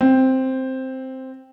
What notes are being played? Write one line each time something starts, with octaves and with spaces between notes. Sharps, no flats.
C4